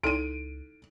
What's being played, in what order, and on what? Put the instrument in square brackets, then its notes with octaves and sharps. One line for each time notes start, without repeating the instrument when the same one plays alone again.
[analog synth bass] C#2 [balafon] D#4 E4 A4 [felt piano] D7 D#7